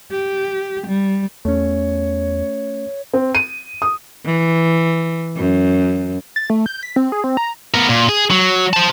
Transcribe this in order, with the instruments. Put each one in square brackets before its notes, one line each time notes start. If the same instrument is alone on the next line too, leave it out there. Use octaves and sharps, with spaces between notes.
[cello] G4
G3
[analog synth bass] E2 [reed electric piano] A3 C#4 [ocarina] C#5
[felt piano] C4
D#7
D#6
[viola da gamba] E3
F#2
[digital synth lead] A6
A3
G6
B6
C4
G#4
C4
A#5
[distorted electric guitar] B3 A#4
A#2
G#4
F#3
C5 A5